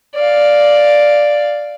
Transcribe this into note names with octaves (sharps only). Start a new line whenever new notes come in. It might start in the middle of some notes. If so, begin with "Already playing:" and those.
D5 F5